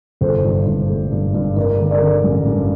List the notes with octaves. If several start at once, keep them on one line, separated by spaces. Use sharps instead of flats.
G1 A4 C5
G2
G2
A3
G2
G2
G2 A#4 D5
D3
A#4 D5
D3
A1
G2